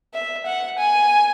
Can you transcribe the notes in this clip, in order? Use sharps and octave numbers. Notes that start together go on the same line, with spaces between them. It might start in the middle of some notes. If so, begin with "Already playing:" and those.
E5
F#5
G#5